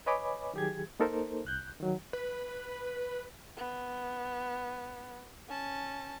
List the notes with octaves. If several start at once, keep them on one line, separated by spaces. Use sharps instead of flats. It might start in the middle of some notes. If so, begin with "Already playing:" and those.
B4 C#5 D#5 G#5 B5 D6
D#3 F#3 G4 G#4 G#6
A#3 D#4 A4 A#4 C5
C2 F#6 G6
D#3 F#3
B4
B3
C#4 A5